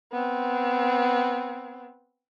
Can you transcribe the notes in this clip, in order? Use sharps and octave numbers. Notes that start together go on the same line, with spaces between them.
B3 C4